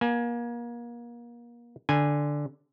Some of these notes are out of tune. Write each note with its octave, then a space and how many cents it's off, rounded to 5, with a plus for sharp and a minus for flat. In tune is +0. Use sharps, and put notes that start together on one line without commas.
A#3 +30 G#5 +10
D3 +0 G#5 -10